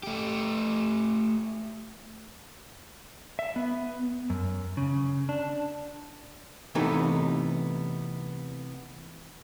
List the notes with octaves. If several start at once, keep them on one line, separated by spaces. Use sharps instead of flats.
A3 G4
E5
B3
F#2
C#3
D4
C3 E3 A3 B3 D#4